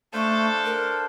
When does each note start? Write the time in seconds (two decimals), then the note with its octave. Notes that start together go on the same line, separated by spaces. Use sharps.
0.13 A3 D4 A4 C5 F5 A5
0.65 A#4